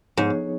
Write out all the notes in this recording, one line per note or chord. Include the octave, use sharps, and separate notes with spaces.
G#2 F3 B3 D#4 G#4 C#5